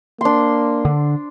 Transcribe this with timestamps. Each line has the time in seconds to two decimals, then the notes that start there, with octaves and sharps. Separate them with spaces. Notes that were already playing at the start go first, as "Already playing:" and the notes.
0.21 A#3 D4 C6
0.85 D3